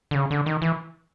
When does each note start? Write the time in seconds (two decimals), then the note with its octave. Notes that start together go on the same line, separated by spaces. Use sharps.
0.11 D3
0.15 C#3
0.31 D3
0.46 D#3
0.62 E3